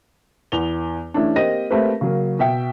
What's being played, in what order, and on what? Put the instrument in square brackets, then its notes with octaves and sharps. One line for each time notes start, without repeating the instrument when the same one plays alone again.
[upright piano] E2 B3 F7 G7
E3 A3 C#4 D4
A#3 C4 G4 D#5 A#6 D#7
A3 A#3 C4 G4 B4
C#3 F#3 A#3
B2 E5 G5